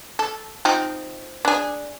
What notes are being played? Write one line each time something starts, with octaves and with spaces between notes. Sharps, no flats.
A4
F3 C4 D#4
D4 G#4